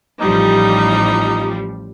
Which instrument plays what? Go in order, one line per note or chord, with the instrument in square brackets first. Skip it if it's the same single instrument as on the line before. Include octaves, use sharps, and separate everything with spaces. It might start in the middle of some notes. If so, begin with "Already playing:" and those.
[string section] A1 F3 G3 [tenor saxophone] D#4